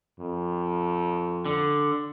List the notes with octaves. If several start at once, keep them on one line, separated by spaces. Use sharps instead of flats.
F2
D3